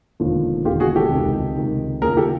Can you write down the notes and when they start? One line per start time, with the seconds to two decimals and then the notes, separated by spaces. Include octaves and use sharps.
0.20 E1 D#2 D3 F3
0.65 E1 D#2 D3 F3 F4 G4
0.80 F#4 G#4
0.96 G4 A4
1.11 C#2 C3 D#3
1.57 C#2 C3 D#3
2.02 D#2 C#3 F3 G#4 A#4
2.17 G4 A4